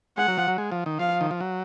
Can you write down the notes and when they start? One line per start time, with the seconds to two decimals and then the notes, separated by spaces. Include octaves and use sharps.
0.17 G#3 F#5
0.28 F#3
0.38 F3
0.48 F#3
0.58 G#3
0.72 F3
0.86 D#3
0.99 F3 F5
1.21 D#3
1.31 F3
1.41 F#3